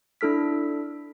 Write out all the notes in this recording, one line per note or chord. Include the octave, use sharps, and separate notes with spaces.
D4 E4 A4 F6 B6